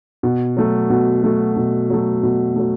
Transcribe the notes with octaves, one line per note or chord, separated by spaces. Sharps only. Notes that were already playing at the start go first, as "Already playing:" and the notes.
B2
F#3 A3
B2
F#3 A3
B2
F#3 A3
B2
F#3 A3